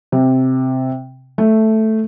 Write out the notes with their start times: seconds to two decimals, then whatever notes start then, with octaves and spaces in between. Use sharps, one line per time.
0.12 C3
1.38 A3